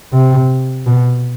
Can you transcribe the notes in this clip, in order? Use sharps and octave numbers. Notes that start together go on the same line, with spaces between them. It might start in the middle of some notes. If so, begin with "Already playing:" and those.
C3
B2